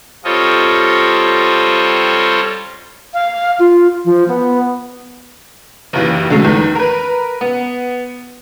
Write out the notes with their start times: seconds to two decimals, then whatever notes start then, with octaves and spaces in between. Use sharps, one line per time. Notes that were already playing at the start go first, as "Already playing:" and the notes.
0.24 G3 C4 F4 A4 C#5 D#5
3.14 F5
3.59 F4
4.05 F3
4.28 B3
5.93 F#1 D#2 E3
6.30 D3 F#3 G#3 A3
6.44 E2 A2 D#3
6.75 A#4 B4
7.41 B3